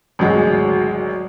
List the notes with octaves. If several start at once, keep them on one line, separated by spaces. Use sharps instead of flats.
G#1 D2 F#3 G#3